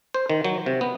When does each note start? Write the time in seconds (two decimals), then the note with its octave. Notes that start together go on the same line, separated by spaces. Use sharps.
0.14 C5
0.30 D#3
0.44 F#3
0.66 C3
0.81 B3